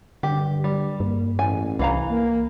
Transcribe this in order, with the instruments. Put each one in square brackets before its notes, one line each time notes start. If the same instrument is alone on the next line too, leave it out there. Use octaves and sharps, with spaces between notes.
[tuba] G2 [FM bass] D3 [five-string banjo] G4
[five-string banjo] G3
[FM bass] G2 [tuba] A#3
[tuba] A1 [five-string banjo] G#5
[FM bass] C2 [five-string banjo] E3 F5 A#5
[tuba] A#3